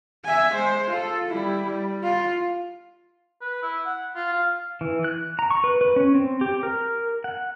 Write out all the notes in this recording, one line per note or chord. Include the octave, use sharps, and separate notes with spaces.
E5 G#5
G#3 C5
F4 A4
G3 E4
G3
F4
B4
E4
F#5
F4
F5
E3
F#6
A#5
C#6
B4
B4
C#4
C4
G4
A#4
F#5